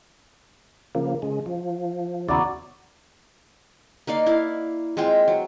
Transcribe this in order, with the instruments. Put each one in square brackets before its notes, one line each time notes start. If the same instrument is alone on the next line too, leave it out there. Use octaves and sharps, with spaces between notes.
[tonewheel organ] C#3 F3 A#3
C#3 G#3
F3
[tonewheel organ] D#2 C#3 E4 [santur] F#3 B3 D5
[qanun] A#3 D#4 D5 F5
E4 F5
G#3 C4 F4 G5
F#3